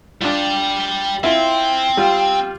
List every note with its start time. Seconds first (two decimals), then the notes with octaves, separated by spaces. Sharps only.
0.21 G3 D4 F4 G4
1.24 C4 E4 F4
1.97 G3 F4